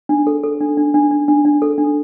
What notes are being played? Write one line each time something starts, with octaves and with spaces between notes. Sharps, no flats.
D4
A4
A4
D4
D4
D4
D4
D4
D4
A4
D4